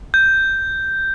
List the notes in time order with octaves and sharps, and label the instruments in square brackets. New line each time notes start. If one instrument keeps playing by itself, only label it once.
[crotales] G6